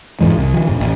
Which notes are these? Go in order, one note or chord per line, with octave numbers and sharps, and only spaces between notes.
F2 G#2 E3 G#3
C2
D#3 F3
F#2 A#2
A1